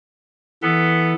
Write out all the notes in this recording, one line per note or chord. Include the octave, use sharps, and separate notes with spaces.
E3 B3 A4